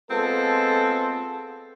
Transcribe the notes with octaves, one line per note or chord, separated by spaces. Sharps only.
G#3 B3 C4 F4 A4